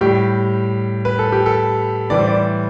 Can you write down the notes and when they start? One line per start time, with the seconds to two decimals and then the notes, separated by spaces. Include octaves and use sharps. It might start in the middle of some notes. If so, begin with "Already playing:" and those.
0.01 A2 G3 G4
1.05 B4
1.19 A4
1.32 G4
1.46 A4
2.10 A2 E3 G3 D5
2.19 C5
2.27 D5